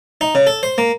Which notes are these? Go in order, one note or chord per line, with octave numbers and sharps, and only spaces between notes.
D#4
C#3
A4
C5
A#3